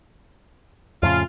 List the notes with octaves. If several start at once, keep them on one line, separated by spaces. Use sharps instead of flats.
F2 A2 C#3 F4